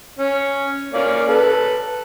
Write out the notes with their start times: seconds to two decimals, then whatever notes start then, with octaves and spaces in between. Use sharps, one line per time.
0.19 C#4
0.94 A#3 C#4 D5
1.28 A4 B4